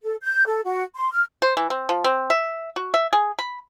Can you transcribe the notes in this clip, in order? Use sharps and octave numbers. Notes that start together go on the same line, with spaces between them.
A4
G6
A4
F#4
C6
F6
C5
E3
C4
F3
C4
E5
F#4
E5
G#4
B5